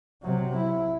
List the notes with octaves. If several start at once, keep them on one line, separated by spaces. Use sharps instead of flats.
C3 F#3
E4